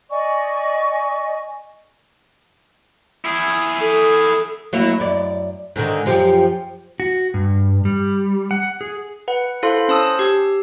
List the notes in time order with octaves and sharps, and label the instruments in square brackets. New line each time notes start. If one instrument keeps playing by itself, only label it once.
[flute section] D5 D#5 G#5 C#6
[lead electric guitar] E4 G#4
[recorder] A4
[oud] F#3 A#3 E4
F#2 D5
G#2 D3 D#3
F#2 F3 G4
[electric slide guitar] F#4
G2
G3
F#5
G#4
[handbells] B4 F#5
E4 A4 C5 F5 C6
C#4 C5 A5 D#6 E6
G4 E6